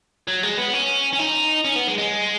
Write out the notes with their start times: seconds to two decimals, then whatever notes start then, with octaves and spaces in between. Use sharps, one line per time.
0.28 F#3
0.43 G#3
0.58 B3
0.74 C#4
1.13 C#4
1.19 D#4
1.65 C#4
1.76 B3
1.88 G#3
1.98 G#3